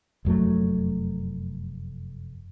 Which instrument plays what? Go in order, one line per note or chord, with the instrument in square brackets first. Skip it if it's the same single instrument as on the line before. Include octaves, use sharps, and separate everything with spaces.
[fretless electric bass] F1 F#2 F#3 A3